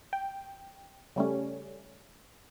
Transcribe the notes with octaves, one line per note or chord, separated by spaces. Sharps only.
G5
C#3 G3 A3 C#4